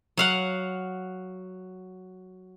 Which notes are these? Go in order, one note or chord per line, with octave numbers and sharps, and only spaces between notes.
F#3 F5 F#5